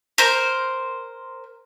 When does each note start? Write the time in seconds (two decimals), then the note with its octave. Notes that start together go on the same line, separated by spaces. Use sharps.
0.18 A#4 C5